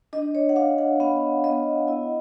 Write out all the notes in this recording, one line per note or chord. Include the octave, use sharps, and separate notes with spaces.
D4 D#5
C#5
F#5
D4 F5
F#5
B3 F5
B3 D#5
E4 D#5